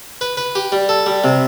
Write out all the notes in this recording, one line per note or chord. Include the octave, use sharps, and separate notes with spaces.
B4
B4
G4
G3
A4
G3
C3